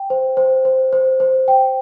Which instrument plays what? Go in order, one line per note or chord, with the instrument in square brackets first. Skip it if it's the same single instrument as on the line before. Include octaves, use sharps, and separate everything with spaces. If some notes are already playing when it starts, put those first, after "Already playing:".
Already playing: [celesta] G5
C5
C5
C5
C5
C5
G5